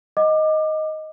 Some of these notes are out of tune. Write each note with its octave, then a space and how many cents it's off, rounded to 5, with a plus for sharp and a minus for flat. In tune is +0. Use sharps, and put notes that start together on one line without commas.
D#5 +5 F#5 +0 D6 +25